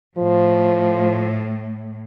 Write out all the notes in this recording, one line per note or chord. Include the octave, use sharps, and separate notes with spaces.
A2 F3